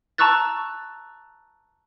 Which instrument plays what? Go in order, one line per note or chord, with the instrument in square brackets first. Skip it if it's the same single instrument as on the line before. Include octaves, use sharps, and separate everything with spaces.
[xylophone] A5 A#5 C#6 E6 F#6 A6